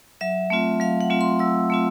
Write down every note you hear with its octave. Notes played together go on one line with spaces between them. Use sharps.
F#3 E5
A3 C4 F4
F#3 F5
F#5
A3 C4 F4
C6
F#3 E6
A3 C4 F4